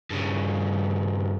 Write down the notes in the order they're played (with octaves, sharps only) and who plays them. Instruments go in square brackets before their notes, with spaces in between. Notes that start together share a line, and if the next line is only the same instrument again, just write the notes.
[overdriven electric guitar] G2 C#3